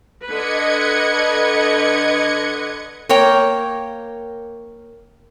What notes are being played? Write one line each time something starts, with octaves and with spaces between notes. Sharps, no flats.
D3 B4 D#5 G#6 C#7
A#3 C#5 G5 A#5